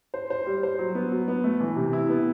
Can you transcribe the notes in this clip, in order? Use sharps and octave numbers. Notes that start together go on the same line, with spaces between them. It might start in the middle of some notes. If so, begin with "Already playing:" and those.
C5
C5
G3
C5
F#3
B3
F#3
B3
A3
E3
C3
E4
B3